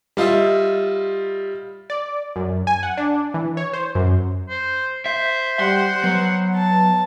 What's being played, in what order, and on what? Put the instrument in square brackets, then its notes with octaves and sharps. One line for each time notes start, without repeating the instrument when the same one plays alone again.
[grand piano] G3 F4 D#5 E5
[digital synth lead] D5
F#2
G#5
F#5
D4
E3
C#5
C5
F#2
[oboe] C5
[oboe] C5 [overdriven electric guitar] E5
[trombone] G3 [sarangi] F#5 [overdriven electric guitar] C6
[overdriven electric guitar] F#3 [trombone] B3
[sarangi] A5